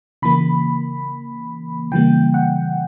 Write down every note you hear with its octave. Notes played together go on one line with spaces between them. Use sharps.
C#3 E3 A#3 B5
C#3 E3 G3 A#3 G5
F#5